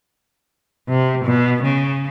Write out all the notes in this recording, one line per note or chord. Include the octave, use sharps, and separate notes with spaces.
C3
B2
C#3